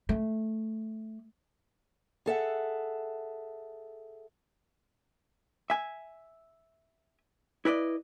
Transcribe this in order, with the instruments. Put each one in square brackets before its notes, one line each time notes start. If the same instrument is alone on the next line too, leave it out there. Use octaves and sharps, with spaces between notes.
[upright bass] A3
[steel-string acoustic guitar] G#4 A4 E5 F#5
[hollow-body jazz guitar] E5 G#5
E4 B4 D5 D#5